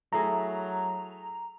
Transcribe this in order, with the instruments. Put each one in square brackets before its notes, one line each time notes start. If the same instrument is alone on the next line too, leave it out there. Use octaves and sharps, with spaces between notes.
[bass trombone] F#3 [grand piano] A3 E4 G#4 [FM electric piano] A#5